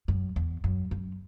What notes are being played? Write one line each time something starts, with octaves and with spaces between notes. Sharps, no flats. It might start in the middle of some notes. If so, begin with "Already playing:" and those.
F#2
E2
F#2
F#2